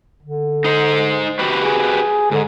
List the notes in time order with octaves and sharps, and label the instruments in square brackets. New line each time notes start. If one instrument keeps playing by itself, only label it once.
[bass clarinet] D3
[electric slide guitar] D#4 C5
F#4 G4 B4
[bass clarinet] G#4
[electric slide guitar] G#2 [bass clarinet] D3